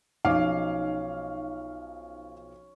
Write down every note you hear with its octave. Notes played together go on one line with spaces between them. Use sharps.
B1 F3 C#4 D#4 F5 D6